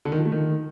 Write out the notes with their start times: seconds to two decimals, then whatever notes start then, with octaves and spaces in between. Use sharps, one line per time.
0.05 D3
0.12 D#3
0.19 F3
0.25 A3
0.32 D#3